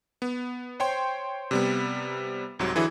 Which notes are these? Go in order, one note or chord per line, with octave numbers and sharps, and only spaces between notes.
B3
C5 C#5 G5 C6
C3 G3 B3
C2 G#2 C3 F#3
D3 E3 F#3 E4 G#4